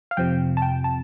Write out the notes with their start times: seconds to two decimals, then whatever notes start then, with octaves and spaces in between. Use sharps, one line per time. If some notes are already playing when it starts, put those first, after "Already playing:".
0.11 F5
0.17 F2 C3 F3 G5
0.57 A5
0.62 G5
0.84 A5